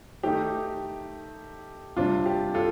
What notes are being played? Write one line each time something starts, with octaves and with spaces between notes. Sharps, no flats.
D#3 A3 D#4 G4
C3 G3 D4 F4
G4
F4 A4